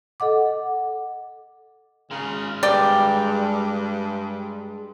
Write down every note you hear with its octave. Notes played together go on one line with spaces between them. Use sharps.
A4 D#5 F#5 D6
C#3 G#3 A#4
G2 D5 G5